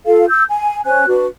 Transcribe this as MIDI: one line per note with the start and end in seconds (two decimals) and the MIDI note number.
0.06 0.26 65
0.06 0.26 69
0.06 0.26 77
0.28 0.44 88
0.28 0.44 91
0.49 0.80 80
0.85 1.06 61
0.85 1.06 72
0.85 1.06 80
0.85 1.06 90
1.08 1.26 62
1.08 1.26 66
1.08 1.26 71